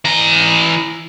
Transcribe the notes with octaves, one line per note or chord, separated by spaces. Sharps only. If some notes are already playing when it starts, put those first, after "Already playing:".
E3 A#5